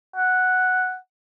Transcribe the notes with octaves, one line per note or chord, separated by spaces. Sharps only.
F#5